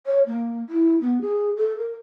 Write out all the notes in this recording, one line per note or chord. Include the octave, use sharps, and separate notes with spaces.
C#5
A#3
E4
B3
G#4
A4
A#4